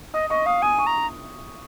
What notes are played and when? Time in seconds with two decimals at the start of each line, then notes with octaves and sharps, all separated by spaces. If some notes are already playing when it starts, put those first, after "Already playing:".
0.14 D#5 D#6
0.30 D#5 C#6
0.46 F5 D#6
0.62 G#5 D#6
0.79 C#6
0.87 A#5